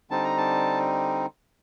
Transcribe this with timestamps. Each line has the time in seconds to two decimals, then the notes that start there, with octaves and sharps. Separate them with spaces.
0.10 D3 G3 C4 D#4 A5
0.24 A#5
0.38 A5